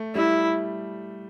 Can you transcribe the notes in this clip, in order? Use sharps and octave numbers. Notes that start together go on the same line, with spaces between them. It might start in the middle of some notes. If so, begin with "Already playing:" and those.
Already playing: A3
G3 E4